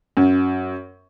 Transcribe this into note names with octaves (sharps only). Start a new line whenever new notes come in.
F#2